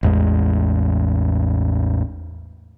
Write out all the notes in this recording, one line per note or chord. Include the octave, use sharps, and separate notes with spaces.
A1 E2 G#3